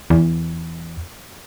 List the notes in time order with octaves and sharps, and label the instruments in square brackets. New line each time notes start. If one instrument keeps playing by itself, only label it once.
[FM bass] E2